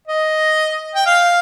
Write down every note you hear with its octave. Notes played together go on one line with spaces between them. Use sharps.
D#5
G5
F5